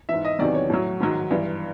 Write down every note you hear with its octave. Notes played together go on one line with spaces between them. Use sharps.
G#2 E3 E5
D#5
E2 C3 D#3 F#3 D5
C#5
A2 F#3
G#2 D#3 F#3
G2 E3